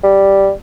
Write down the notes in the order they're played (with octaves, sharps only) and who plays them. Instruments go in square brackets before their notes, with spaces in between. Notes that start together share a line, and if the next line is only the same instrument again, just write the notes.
[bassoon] G3